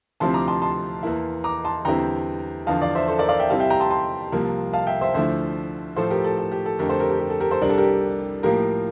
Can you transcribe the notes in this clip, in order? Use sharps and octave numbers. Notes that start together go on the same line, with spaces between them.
D2 C3 F3 C4 E4 A5 C6
A#5 D6
A5 C6
A5 C6
E2 E3 A#3 E4
A#5 D6
A5 C6
E2 D3 G3 C4 E4 G5 A#5
E2 D3 F3 F5 A5
D5 F5
C5 E5
A4 C5
A#4 D5
D5 F5
E5 G5
C3 G3 C4 E4 F5 A5
E5 G5
G5 A#5
A5 C6
A5 C6
C2 C3 F3 A#3
F5 A5
E5 G5
C5 E5
D2 D3 F3 A3 E4 C5 E5
A2 F3 A3 A4 C5
G4 A#4
A4
A4
G4
A4
F2 D3 A3 G4 A#4
A4 C5
G4 A#4
G4
G4
A4
G4 A#4
A4 C5
C2 C3 G3 D4 A#4
A4
G4 A#4
A2 F3 A#3 G4 A#4